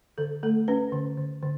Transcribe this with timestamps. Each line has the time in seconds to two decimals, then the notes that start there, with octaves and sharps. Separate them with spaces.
0.18 D3 A4
0.43 A3 A4
0.68 C#4 B4
0.93 D3
1.18 D3
1.43 D3